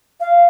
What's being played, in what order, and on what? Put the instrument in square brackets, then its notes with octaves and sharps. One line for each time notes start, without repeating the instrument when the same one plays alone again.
[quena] F5